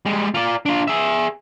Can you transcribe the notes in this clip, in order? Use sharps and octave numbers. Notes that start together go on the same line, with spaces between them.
G3 G#3
F4 D5
D4 F4
G#4 E5